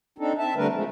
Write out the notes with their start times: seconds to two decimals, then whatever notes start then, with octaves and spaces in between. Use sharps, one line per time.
0.18 C4 D4 D#4 A4
0.38 C4 E5 A5
0.56 D3 G3 A3 D4 A#4 B4
0.73 F3 G#3 A3